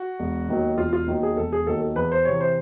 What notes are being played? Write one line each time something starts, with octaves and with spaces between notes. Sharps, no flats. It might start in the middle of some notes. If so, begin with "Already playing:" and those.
Already playing: F#4
E1
D#2 D#3 F#3
E1 F4
F4
D#2 D#3 F#3
G#4
E1 A4
G#4
D#2 D#3 F#3 A4
A4
E2 B4
C5
C3 E3 C#5
C5